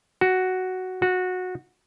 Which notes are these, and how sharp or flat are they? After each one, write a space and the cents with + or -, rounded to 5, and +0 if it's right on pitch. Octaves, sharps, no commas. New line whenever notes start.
F#4 +5
F#4 -15